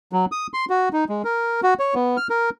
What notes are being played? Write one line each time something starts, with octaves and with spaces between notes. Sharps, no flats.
F#3
D#6
C6
F#4
D#4
G#3
A#4
F#4
C#5
B3
F6
A#4